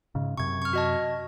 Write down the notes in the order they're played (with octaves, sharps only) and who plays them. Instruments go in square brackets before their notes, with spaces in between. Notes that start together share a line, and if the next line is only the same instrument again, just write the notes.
[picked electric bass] G#2 C#3
[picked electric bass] F#2 C3 [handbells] C#6 G#6
[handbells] C#6 F6
F#4 D#5 A5